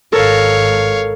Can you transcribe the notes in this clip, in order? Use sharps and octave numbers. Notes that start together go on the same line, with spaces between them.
G#1 A4 A#4 C#5 F5